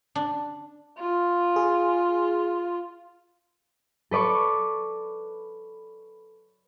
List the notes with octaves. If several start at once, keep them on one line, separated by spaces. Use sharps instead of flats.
D4
F4
G#4
A4 B4 D5 C#6 D6